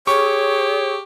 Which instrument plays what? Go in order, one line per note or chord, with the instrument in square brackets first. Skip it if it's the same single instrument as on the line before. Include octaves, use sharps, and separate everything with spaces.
[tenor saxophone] G4 [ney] G#4 [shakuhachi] C#5 [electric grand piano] C#6